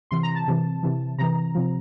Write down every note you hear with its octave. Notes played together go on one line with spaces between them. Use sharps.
C3 E3 C6
A#5
A5
C3 E3
C3 E3
C3 E3 A#5
C3 F3